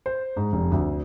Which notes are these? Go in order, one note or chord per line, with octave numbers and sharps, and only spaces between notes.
C5
G#2
F1
D2